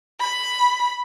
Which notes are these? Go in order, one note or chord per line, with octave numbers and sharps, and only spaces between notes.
B5